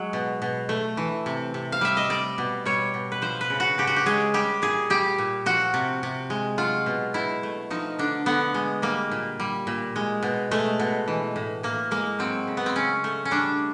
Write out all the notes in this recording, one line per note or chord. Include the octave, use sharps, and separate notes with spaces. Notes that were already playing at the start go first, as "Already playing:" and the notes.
Already playing: F#3 G#3
B2
B2
A3
E3
C3
C3
F5
G3 E5
D#5
G3 D5
B2
G3 C#5
B2
B4
F3 C5
B4
C#3
F#4
C#3 G4
F#4
G4
G#3 G#4
G3 G4
A#2 G#4
G3 G4
A#2
F3 F#4
C3
C3
G#3
F#3 F4
B2
B2 E4
A3
F3 D#4
D3 D4
D3 B3
G#3
G3 A#3
A#2
G3
A#2
G#3
B2
G#3 A3
B2
E3
A2
A2 A#3
G#3 A#3
F#3 C4
C#3
B3
C4
C#3 C#4
A3
C#4
G3 D4